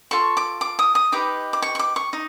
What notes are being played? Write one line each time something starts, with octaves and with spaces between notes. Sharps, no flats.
F4 A4 C#6
D6
D6
D#6
D#6
D#4 G4 B4 D6
D6
C#6
C#6
D6
C#6
D#4